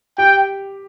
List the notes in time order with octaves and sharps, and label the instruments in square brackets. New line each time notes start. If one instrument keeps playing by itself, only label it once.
[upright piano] G4 [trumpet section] G5